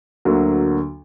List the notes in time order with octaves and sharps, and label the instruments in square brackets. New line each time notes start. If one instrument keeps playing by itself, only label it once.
[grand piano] D2 D3 F#3 A#3